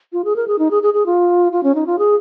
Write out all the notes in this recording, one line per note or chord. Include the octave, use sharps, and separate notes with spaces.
F4
G#4
A#4
G#4
D#4
G#4
G#4
G#4
F4
F4
C#4
D#4
F4
G#4